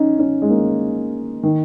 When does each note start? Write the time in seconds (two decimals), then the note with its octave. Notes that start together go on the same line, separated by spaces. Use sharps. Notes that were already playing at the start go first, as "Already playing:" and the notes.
Already playing: C#4 D#4
0.19 C#4
0.42 G#3
0.50 A#3
1.43 D#3